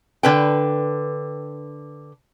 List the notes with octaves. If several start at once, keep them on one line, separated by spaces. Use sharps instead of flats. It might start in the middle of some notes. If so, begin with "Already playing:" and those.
D3 B4 G5